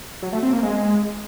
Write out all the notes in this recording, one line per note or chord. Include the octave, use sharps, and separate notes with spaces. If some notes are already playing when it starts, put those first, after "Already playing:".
F#3
A3
C4
A#3
G#3